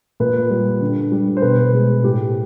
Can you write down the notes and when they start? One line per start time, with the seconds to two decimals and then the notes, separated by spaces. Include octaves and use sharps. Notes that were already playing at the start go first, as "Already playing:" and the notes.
0.20 A#2 B4
0.50 G3
0.81 D3
1.12 G3
1.37 C5
1.42 B2 B4
1.73 G#3
2.04 A2 G4